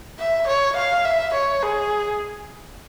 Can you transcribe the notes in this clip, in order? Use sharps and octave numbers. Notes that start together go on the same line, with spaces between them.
E5
C#5
F5
E5
C#5
G#4